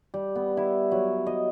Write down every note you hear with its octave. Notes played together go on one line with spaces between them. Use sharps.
G3
B3
E4
F#3
D#5